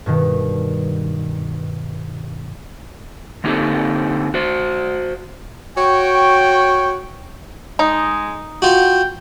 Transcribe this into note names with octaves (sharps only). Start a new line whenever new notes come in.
G2 B2 D#3
D3 A#3 C4 D#4 G4 A4
F#4 C5
F#4 C#5 G5
G#3 D#4
F4 F#4 G5